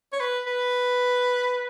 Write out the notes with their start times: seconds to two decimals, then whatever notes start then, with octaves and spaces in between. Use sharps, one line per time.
0.13 C#5
0.20 B4
0.46 B4